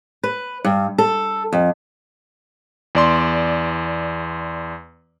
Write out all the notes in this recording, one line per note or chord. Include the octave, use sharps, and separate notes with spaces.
B4
G2
A4
F2
E2 D5 C6